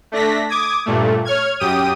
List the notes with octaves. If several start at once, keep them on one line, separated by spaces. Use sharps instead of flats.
A3 D4 A#6 B6
D6 D#6 G#6
G2 A#2 A3
C#5 F6 G#6
F#2 G4 G5 D#6 D#7